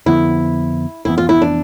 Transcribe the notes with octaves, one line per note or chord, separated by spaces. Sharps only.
F2 D3 F3 B3 E4
F1 F2 E3 B3 E4
F4
E4
D4